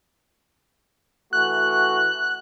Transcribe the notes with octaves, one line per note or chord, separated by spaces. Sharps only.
E3 A3 F#4 F#6